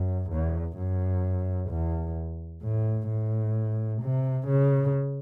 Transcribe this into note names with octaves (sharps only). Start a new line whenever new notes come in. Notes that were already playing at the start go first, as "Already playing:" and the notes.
Already playing: F#2
E2
F#2
E2
A2
A2
C3
C#3